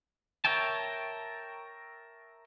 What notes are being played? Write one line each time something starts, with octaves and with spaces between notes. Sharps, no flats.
A#4 C#5 E5 G5 A5